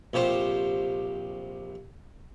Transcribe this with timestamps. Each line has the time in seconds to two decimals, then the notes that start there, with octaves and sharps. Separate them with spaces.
0.13 A#1 C3 G4 C5